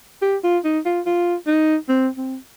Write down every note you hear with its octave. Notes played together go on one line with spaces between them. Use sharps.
G4
F4
D#4
F4
F4
D#4
C4
C4